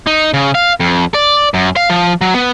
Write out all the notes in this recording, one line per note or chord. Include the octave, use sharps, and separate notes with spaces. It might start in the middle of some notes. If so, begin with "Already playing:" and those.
D#4
C#3
F5
F2
D5
F#2
F5
F3
F#3
B3